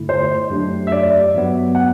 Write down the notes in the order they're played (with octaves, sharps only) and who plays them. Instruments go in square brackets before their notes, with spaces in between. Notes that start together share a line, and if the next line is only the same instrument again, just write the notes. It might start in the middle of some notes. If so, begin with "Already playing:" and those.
Already playing: [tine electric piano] G2 D3 A3 E4
[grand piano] C5
[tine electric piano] F#2 F#3 A3 D4 G4
[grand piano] E5
D5
[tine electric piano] G2 F#3 B3
[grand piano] F#5